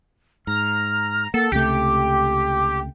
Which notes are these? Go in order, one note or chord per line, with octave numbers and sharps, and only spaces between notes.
G#2 A#5 F6
A#3 A4 F#5
C#2 C3 A3 G4 G5